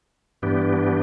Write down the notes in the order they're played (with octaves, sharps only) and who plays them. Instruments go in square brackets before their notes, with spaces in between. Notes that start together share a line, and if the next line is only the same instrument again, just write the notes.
[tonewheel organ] G2 E3 B3 D4 G4